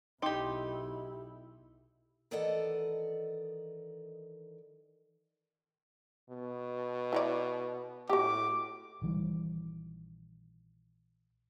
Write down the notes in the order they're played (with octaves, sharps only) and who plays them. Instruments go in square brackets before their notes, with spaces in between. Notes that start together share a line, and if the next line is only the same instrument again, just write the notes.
[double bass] B1 E4 [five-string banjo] D#4 G4 [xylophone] G5 C6 D6
[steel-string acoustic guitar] D#3 E3 A4 D5 D#5 F#5
[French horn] B2
[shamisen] E4 C#5 D5
[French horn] A2 [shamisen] F#4 G4 [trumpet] D6
[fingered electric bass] A#1 D#3 E3 G3